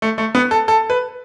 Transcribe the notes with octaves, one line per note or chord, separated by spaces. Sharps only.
A3
A3
B3
A4
A4
B4